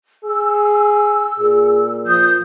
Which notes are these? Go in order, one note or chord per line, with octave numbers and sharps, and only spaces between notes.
G#4 E6
A#2 G#4
F3 D#6 G6